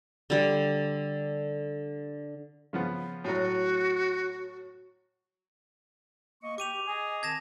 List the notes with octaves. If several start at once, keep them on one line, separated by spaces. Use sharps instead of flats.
D3 G3
C#3 F3 B3
A2 F#3 F#4
A#3 D#5 C#6
G4 D6 D#7 F7
G#4 D#5 G#5
D#3 C4 A5 G#6 A#6 E7